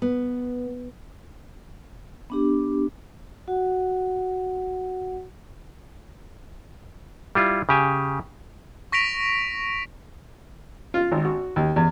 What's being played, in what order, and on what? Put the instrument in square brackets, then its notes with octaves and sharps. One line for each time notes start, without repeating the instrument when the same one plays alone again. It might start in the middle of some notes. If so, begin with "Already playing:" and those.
[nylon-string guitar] B3
[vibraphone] B3 D4 G4
F#4 F#5
[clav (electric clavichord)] G3 E4 F4
C#3 G4 G#5
[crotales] C#6 A#6 B6 D7 F7
[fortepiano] F4
G#1
F#4
D#2
E2